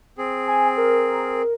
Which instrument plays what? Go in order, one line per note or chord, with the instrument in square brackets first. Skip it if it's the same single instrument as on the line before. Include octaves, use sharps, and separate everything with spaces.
[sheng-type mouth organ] C4 G#4
[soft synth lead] G#5
A#4